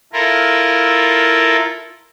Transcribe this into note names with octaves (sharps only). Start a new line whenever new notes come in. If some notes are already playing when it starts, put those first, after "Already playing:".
E4 F4 A4 A#4